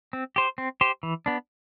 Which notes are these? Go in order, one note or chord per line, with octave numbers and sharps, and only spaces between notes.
C4
G4 C5
C4
G4 C5
E3
B3 D4